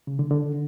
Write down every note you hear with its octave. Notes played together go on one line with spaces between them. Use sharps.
C#3
D3
D3